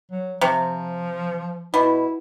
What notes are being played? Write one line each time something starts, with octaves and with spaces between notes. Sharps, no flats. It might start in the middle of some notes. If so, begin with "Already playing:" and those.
F#3
C3 F3
B2 E4